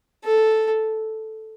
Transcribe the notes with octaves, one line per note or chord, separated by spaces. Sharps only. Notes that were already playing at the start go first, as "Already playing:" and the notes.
A4